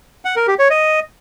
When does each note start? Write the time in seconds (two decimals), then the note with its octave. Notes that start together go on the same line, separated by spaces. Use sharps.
0.25 F#5
0.36 A#4
0.48 G4
0.59 C#5
0.70 D#5